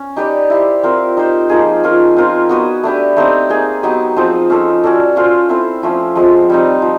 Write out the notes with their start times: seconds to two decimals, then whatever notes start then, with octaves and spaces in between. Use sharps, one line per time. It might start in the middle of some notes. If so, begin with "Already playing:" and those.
Already playing: C#4
0.16 D#4 G4 B4 D5
0.50 E4 G4 C5
0.83 C4 F4 A#4
1.17 D#4 G4 C5
1.50 F3 A#3 D#4 G#4
1.84 C#4 F4 A#4
2.17 C4 F4 A#4
2.49 B3 D#4 F#4 B4
2.83 A3 D4 G4 B4
3.17 A3 C4 D#4 G4
3.50 A#3 D#4 G#4
3.83 F#3 B3 D#4 G4
4.16 F3 G#3 C4 D#4
4.50 C#4 F4 A4 C#5
4.84 C#4 F#4 A4 D5
5.16 C#4 F4 A4 C5
5.49 C4 E4 A4 C5
5.83 F3 A3 C#4
6.15 F3 G#3 C4
6.50 G3 C4 D#4
6.82 F3